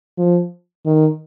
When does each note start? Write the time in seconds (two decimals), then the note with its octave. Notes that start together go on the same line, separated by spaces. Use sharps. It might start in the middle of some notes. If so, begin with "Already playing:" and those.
0.18 F3
0.86 D#3